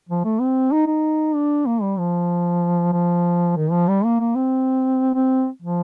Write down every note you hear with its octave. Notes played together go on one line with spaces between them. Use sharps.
F3
A3
C4
D#4
D#4
D4
A#3
G3
F3
F3
D#3
F3
G3
A#3
A#3
C4
C4
F3